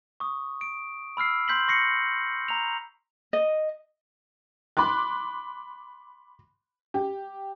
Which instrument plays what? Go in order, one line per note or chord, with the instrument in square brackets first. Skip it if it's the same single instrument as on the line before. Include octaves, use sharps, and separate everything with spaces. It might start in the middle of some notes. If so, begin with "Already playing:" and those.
[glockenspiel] C#6 D#6
D7
B5 E6 F6 C7
C6 G6 B6 F#7
C#6 A#6 C7 C#7
A#5 F7
[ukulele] D#5
[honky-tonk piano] B5 C6 D6 F#6
G4